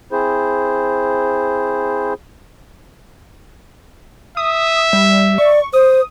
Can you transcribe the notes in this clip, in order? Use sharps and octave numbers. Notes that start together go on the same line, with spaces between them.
C4 E4 G#4 C5
E5 D#6
G3
D5 C#6
C5 D#6